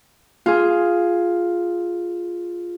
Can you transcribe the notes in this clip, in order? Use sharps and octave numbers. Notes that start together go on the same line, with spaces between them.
F4 G#4